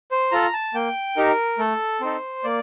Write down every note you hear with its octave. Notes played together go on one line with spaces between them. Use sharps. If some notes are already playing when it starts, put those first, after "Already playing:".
C5
F4 A4 A#5
A5
A#3 G5
D#4 G4 A#4
A3 A4
C4 D#4 A4 C5
A#3 D5